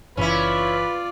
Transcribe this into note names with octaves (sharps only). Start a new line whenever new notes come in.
F#1 E3 C#4 E4 F4 B4 D5